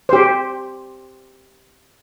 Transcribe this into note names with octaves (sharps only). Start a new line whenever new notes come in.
G4 C5